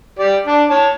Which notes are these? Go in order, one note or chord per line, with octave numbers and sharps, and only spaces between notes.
G4 D5
D4
C#5 A5